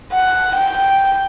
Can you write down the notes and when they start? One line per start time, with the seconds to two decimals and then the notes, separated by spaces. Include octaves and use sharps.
0.12 F#5
0.55 G5